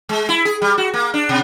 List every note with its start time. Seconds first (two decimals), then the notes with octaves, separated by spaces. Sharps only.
0.09 G#3
0.29 E4
0.45 G#4
0.62 G3
0.78 F#4
0.94 A#3
1.14 D4
1.29 B2